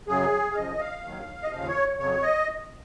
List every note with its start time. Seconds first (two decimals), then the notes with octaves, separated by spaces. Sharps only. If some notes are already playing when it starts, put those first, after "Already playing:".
0.08 F#2 C#3 F#3 G#4
0.52 F5
0.55 F#2 C#3 F3 D#5
0.80 F5
1.03 D#2 D#3 F#3
1.43 D#5
1.51 D#2 C#3 F3 F5
1.68 C#5
1.99 F2 C#3 F#3 C#5
2.23 D#5